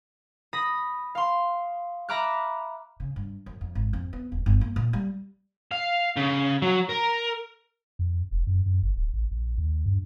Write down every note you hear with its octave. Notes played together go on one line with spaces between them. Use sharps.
B5 D#6 A#6 B6
F5 C6
E5 A#5 B5 D6 F6 F#6
C#3
G2
F#2
F2
G#1
F2
B3
D#1
G1
A#3
A#2
G3
F5
C#3
F#3
A#4
F2
E1
F#2
F#2
G1
D1
A1
A#1
D#2
G2